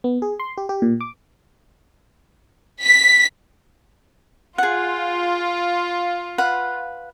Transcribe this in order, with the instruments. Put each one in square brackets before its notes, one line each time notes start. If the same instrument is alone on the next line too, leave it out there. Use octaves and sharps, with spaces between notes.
[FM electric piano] B3
G#4
C6
G4
G4
A#2
D6
[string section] B6
[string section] F4 [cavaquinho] G#4 F#5
[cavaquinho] B4 F5 F#5